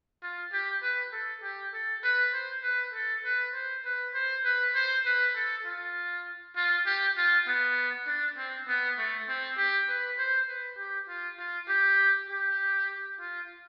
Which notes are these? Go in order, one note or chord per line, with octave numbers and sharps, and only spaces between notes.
F4
G4
B4
A4
G4
A4
B4
C5
B4
A4
B4
C5
B4
C5
B4
C5
B4
A4
F4
F4
G4
F4
B3
D4
C4
B3
A3
C4
G4
B4
C5
B4
G4
F4
F4
G4
G4
F4